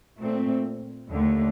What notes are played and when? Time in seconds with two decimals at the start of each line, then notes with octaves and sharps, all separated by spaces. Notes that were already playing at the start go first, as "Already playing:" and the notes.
0.19 A#2 A3 C4
1.10 D#2 D3 A3